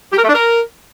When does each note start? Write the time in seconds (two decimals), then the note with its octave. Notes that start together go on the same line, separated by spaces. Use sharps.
0.13 G4
0.18 A#4
0.24 A3
0.29 D4
0.35 A#4